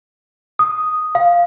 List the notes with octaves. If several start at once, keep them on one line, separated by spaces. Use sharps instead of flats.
D#6
F5